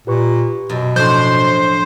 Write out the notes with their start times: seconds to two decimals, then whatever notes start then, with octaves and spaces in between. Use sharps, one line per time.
0.07 A#2 G4 B4 C#6
0.69 F#2 B2
0.96 A2 F3 D4 C5 G6